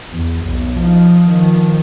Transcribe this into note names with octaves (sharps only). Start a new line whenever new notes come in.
E2
B1
F3 D#4
D#3 F3